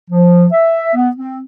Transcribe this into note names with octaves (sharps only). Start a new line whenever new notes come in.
F3
E5
B3
C4